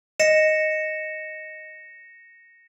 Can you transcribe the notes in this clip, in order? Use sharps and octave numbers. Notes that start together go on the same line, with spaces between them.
D#5 A#6 C#7 E7